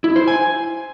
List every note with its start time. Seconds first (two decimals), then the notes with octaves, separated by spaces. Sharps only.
0.04 E4
0.16 C5
0.28 G#5